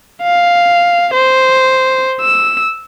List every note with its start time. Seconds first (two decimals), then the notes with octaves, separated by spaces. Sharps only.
0.23 F5
1.14 C5
2.21 E6